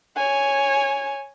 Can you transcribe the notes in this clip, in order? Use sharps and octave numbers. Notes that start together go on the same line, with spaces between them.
C#5 G#5